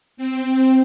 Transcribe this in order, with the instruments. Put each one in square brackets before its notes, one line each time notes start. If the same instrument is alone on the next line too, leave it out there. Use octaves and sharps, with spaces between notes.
[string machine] C4